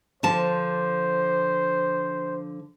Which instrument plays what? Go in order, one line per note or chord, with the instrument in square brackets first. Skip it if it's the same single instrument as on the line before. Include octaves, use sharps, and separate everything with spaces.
[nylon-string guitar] D3 F3 A5 [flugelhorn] C5